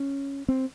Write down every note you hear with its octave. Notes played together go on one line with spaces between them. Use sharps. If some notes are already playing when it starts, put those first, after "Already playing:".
Already playing: C#4
C4